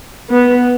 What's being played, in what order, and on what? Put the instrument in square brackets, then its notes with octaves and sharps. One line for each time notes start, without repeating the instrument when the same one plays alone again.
[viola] B3